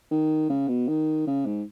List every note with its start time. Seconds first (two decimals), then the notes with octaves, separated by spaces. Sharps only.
0.11 D#3
0.50 C#3
0.68 B2
0.88 D#3
1.27 C#3
1.46 G#2